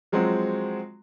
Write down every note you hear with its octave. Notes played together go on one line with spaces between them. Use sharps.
F3 F#3 G#3 C4 F#4